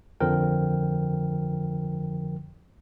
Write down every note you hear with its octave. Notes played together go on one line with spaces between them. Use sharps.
F2 D3 F3 A#4 G5